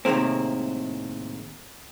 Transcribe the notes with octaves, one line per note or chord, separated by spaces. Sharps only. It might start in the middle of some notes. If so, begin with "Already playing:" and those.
A2 C3 D#3 G#3 A#3 C4